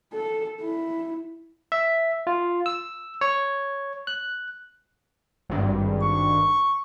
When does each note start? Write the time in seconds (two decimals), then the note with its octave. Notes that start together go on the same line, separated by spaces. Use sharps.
0.13 A4
0.62 E4
1.72 E5
2.27 F4
2.66 E6
3.21 C#5
4.07 F#6
5.49 G#1 G2
6.02 C#6